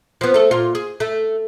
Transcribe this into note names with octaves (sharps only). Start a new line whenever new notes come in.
F3 B3
A3 A4
A#2 F4
G#4
A3